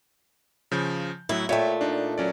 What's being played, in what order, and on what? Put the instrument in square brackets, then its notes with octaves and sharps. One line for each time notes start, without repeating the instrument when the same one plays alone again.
[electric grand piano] C#3 F3 G6
[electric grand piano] A2 F#3 [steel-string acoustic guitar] E4
[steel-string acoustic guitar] A#2 A3 [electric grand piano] C#5 E5 G5
[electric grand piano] D4 D#4
F#3 C#4 D5